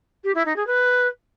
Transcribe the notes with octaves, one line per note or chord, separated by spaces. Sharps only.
G4
E4
D#4
G#4
B4